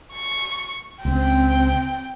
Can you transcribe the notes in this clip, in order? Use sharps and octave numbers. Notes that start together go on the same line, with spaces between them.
C#6
C#2 C4 G5